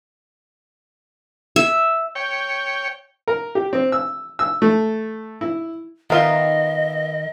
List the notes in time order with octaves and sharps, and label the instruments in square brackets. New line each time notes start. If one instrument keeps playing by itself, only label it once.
[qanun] E5
[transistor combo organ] C#5 G5
[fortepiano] A#4
G4
C4
E6
E6
A3
E4
[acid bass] D#3 [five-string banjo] B3 F4 [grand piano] A#4 E5 G7 [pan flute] D#5